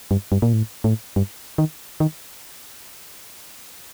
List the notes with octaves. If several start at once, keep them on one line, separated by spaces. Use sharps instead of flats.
G2
G2
A#2
A2
A2
G2
D#3
D#3